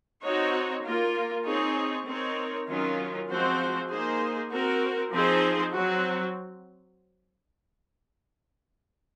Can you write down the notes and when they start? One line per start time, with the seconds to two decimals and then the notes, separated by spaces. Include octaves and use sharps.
0.23 C4 D#4 F#4 C#5
0.84 A#3 F4 A#4
1.45 C4 D#4 G#4 C#5
2.06 C4 D#4 A#4 C#5
2.68 D#3 F#3 C#4 F4 A#4
3.28 F3 G#3 C4 F#4 C5
3.90 A#3 D#4 G#4 C5
4.51 C4 F#4 A#4
5.11 F3 C4 D#4 G#4 C5
5.73 F#3 C4 F#4